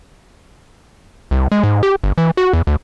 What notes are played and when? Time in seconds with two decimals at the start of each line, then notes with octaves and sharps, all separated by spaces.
1.31 C2
1.52 G#3
1.63 G#2
1.83 G4
2.04 G1
2.18 E3
2.37 F#4
2.53 E2
2.67 D2